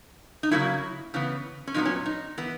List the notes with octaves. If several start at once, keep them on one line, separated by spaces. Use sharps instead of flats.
D#4
C#3 F#3 A#3 E4
C#3 E3 B3
C#4
A#2 F#3 B3 D#4
C#4
D#4
E3 B3